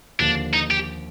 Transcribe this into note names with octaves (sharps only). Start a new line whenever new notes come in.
D#2 D3 F3 A#3 D4
D#4
G4